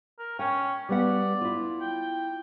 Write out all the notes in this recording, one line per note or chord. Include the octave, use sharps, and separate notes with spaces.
A#4
C#4 G5
G3 B3 D5 F#5
E4 F4
G5